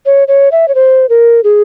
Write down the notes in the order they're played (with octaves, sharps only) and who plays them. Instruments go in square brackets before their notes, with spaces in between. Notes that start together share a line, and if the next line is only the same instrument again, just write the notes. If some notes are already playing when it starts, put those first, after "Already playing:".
[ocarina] C#5
C#5
E5
C#5
C5
A#4
G#4